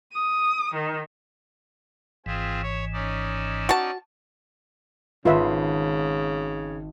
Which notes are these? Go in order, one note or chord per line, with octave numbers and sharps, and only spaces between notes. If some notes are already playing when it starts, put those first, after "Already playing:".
D#6
D#3
G#1 G#2 E3 C4 F4 G#4
C#5
C#4 D#4 D5
F#4 A5
G#1 C#3 F4 B4 E5